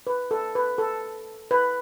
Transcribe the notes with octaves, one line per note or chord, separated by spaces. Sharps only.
B4
A4
B4
A4
B4